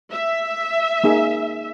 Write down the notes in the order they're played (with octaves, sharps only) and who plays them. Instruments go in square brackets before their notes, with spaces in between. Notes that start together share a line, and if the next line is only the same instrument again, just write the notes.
[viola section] E5
[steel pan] A#3 D#4 G#4